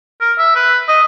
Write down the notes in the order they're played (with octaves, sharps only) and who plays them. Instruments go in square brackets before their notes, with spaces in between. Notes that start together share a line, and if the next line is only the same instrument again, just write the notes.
[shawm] A#4
E5
B4
D#5